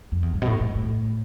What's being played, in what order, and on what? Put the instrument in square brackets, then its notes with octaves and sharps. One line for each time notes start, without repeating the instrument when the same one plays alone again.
[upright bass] F2
E2
G2
B2
A2
A2
A2